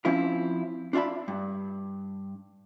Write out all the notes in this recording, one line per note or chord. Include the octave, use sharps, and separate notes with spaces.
F3 C4 C#4 E4 F4
D4 F4 D5 E5 B5
G2